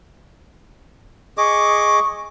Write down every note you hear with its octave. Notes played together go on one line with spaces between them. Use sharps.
G#4 D#5 C#6 D6